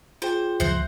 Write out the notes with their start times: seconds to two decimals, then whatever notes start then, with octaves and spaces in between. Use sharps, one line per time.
0.22 F4 G#4 C5 G5
0.60 F#1 C#2 F3 C5 E5 F#5 G6